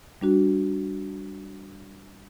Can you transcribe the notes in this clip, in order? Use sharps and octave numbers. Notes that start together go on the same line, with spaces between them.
G3 D4 F#4